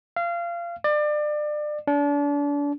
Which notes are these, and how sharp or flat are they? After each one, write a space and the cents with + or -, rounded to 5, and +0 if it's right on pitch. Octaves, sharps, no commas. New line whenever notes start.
F5 -25
D5 +30
D4 -35